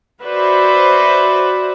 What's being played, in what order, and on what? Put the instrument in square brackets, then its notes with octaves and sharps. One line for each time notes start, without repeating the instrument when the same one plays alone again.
[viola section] F#4 B4 C5 D5 E5